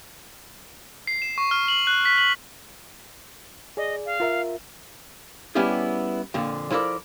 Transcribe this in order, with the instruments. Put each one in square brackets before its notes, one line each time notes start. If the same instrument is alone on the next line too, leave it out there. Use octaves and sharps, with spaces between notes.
[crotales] C7
E7
C#6
F6
F#7
F#6
B6
F#7
[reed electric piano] G#4 D5 [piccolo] D#5
[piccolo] F5
[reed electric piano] F4 A#4 E5
[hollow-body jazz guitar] G3 B3 C#4 E4 G4 G#4
F2 A#2 D3
F3 E4 A4 A#4 D5